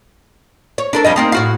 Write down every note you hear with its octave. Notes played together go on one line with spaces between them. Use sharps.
C#5
D4 A4 A#4
F2 G3 D#5
A#3 C4 D#4
A2 F#4 F5